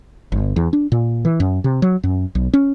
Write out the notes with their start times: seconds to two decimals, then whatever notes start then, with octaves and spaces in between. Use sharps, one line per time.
0.32 G1
0.56 E2
0.73 D4
0.92 A#2
1.25 E3
1.40 F#2
1.64 C3
1.82 F#3
2.04 F#2
2.35 B1
2.53 C#4